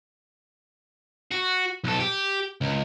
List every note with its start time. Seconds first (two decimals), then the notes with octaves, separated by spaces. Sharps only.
1.31 F#4
1.84 B1 A4
2.00 G4
2.61 C#2